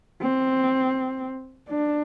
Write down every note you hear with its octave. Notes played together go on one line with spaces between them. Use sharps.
C4
D4